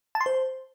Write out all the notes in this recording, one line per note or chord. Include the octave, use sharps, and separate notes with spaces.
A5
C6
C5